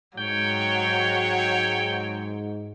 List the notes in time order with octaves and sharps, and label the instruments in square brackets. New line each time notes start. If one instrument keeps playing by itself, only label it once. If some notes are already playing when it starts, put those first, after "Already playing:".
[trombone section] G#2 [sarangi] F#3 [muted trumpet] C#5 [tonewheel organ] G5